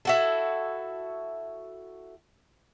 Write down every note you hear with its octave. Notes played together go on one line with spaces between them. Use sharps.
E4 F#4 A4